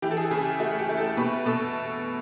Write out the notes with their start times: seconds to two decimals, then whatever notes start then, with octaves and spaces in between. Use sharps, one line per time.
0.02 E3 G4
0.11 A4
0.17 G#4
0.31 C#3 G#4
0.45 G4
0.59 A3 F#4
0.79 G4
0.89 A3
0.98 A4
1.17 B2 B4
1.46 B2 A4